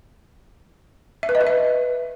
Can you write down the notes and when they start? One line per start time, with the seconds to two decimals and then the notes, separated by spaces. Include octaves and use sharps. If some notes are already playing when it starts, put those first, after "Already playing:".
1.23 E5
1.29 B4
1.35 D#5
1.41 B4
1.47 E5